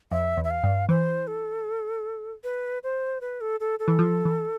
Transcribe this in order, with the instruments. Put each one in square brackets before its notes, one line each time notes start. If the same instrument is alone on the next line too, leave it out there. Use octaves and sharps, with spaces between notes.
[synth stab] F2 [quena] E5
[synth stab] E2
[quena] E5
F5
[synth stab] G2
[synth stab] E3 [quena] C5
[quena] A4
B4
C5
B4
A4
A4
A4
[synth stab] E3
F3
E3